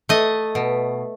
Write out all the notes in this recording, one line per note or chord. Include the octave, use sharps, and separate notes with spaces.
A3 D#5
B2